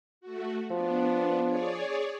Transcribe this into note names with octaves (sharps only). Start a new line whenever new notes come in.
A3 F#4
F3 B3 D4
G#4 C#5 D5